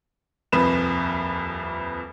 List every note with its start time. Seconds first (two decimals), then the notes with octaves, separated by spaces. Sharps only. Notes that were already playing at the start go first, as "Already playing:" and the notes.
0.52 D#1 C2 F2 B4 E7